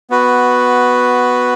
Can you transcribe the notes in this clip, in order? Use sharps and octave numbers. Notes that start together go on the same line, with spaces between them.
B3 F#4 B4